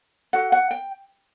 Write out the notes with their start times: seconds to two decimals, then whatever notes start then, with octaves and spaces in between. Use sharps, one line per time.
0.33 F#4 A4 F#5
0.52 F#5
0.71 G5